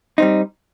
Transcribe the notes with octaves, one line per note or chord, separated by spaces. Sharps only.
G3 C4 D#4